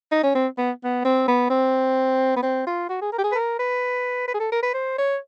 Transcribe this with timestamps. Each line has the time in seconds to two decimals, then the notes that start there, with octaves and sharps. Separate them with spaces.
0.12 D#4
0.23 C#4
0.35 C4
0.58 B3
0.84 B3
1.05 C4
1.28 B3
1.50 C4
2.36 B3
2.43 C4
2.67 F4
2.89 F#4
3.01 G#4
3.13 A#4
3.19 G4
3.24 G#4
3.32 B4
3.35 A#4
3.59 B4
4.28 B4
4.34 G#4
4.40 A4
4.52 A#4
4.62 B4
4.74 C5
4.98 C#5